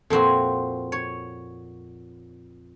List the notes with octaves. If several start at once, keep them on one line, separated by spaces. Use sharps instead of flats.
F2 A#2 C4 F#4
C#5